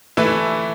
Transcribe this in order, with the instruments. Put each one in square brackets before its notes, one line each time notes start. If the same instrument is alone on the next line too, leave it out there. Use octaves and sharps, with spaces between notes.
[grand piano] E3 A3 E4 B4